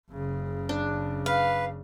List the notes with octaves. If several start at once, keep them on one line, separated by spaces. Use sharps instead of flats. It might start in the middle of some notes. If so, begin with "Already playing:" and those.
F#1 C#3
D4
B4 F5